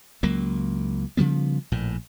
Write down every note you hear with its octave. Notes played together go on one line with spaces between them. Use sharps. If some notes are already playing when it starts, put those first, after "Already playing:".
C#2 F#3 A#3
C#3 F3 G3 B3
A#1 A2